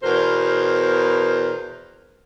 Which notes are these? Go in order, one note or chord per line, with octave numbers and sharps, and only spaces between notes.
E2 B2 A#4 C5